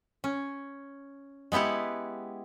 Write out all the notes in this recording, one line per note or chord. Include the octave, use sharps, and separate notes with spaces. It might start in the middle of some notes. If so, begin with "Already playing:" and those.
C#4
G#3 B3 E4 G4 F#5